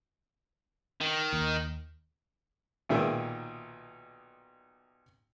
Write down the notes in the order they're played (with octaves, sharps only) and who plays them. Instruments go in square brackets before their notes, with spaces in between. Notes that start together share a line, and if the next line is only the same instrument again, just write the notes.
[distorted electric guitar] D#3
[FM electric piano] D#2
[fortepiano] B1 A#2 D#3 G#4 E5